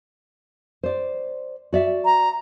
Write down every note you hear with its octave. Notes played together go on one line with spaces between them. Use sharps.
C5 D5
F#4 D5 E5
A#5